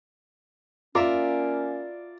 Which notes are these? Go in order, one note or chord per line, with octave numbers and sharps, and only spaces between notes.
A#3 C#4 F4 A#4 D5 E5